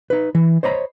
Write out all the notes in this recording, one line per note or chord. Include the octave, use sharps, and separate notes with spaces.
D#4 B4
E3
C5 C#5 D#5 A#5 B5